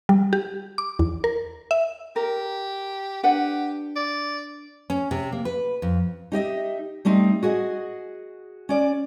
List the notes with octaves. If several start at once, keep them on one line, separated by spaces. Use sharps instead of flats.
G3
G4
D6
E2
A#4
E5
G4 A#4
D4 G4 B4 F#5
D5
C#4
C3
A#3
B4
F2
D#4 G4 D#5 E5
G3 A3 C4 D#4
F#4 G#4 D#5 F#5
C#4 D5